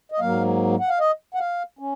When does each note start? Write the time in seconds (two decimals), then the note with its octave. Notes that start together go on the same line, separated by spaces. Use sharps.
0.12 D#5
0.19 G#2 F#3 A#3 F5
0.80 F#5
0.89 F5
0.99 D#5
1.34 F#5
1.39 F5
1.79 C#4